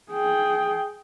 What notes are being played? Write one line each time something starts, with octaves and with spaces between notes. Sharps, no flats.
G#4 G5